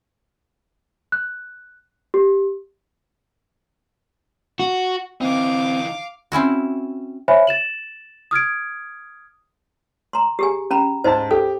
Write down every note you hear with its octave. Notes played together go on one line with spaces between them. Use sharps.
F#6
G4
F#4
E3 C4 D#4 F5 D6
C4 C#4 E4 F#4
C5 C#5 E5 G#5 B5
A6 E7 F#7
D#6 F6 G#6 D7
A#5 C6
G4 G#4 G#5
C#4 A#5 B5
G#2 C5 D#5 A5
G4 A4